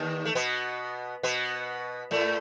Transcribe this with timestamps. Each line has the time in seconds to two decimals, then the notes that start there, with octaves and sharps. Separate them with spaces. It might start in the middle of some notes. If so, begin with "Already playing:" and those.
Already playing: D#2 D#3
0.25 A3
0.35 B2 B3
1.23 B2 B3
2.11 A2 A3